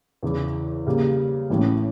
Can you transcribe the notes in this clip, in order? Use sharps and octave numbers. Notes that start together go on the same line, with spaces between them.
E2 C#3 E3
C#3 G3 A#3
A1 A2 E3